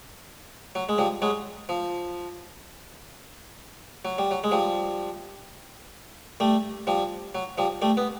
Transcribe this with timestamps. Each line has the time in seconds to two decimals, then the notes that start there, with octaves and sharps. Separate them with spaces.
0.75 F#3
0.89 G#3
0.98 F3 G3
1.22 F#3 G#3
1.69 F3
4.05 F#3
4.18 G3
4.31 F#3
4.44 G#3
4.51 F3 G3
6.40 G3 A3
6.87 F3 G3
7.35 F#3
7.58 F3 G3
7.82 G3 A3
7.97 B3